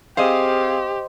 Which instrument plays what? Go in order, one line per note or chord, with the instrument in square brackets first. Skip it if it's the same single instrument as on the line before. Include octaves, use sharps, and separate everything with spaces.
[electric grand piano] C4 G#4 F5 [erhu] G4 [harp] C5 D#5